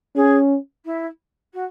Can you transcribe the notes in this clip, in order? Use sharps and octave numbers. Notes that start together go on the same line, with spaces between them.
C#4 G#4
E4
F#4